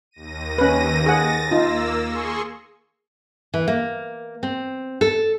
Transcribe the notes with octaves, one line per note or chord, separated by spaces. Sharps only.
D#2 A#6 D#7
C#4 B4
G#4 F#5 A6 A#6
A#3 D#4 F4 E6
G#4 C6 C#6
E3
A#3
C4
A4